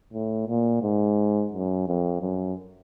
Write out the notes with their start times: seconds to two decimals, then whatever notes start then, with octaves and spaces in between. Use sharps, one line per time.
0.13 A2
0.47 A#2
0.82 G#2
1.53 F#2
1.88 F2
2.22 F#2